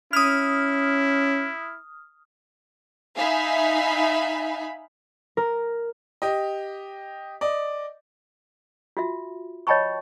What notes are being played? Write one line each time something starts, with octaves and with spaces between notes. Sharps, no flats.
C#4 E4 D#6 F6
D#4 E5 F5 G#5 B5
A#4
G4 D#5
D5 D#5
F4 F#4 E5
C#5 D#5 G5 A5 B5 C#6